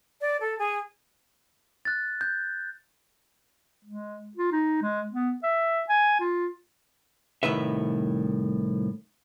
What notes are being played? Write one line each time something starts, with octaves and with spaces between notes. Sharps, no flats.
D5
A4
G#4
F#6 A6
G6
G#3
F4
D#4
G#3
B3
E5
G#5
F4
C2 A2 D#3 B4 E5